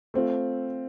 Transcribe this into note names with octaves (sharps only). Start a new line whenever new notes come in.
A3 C4 F4